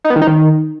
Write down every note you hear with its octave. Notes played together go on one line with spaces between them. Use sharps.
D#4
B3
D#3
D#4
D#3